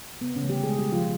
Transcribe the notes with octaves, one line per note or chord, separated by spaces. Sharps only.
C3 B3
C#3 C#4
E3 A3
G3 G4
B2 G#3 G#4
G3 G4
G#3
F3 F4